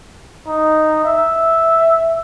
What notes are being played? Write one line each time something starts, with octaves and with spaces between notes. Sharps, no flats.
D#4
E5